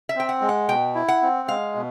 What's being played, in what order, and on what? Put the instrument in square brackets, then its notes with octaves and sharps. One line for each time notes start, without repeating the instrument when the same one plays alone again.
[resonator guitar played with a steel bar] E5
[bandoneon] C4 [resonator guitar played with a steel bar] G5
[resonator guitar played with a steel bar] F#5
[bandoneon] G#3
[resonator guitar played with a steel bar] F#5
[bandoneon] B2 [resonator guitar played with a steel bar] G5
[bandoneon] E4
[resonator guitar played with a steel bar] F#5
[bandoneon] C4
[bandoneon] G#3 [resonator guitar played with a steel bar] F5
[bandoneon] B2